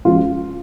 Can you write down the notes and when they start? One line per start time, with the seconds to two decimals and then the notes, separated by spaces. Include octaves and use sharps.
0.05 F#2 F3 G#3 F4